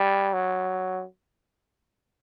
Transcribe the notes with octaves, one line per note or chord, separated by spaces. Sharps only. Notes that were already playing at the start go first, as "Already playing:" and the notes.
Already playing: G3
F#3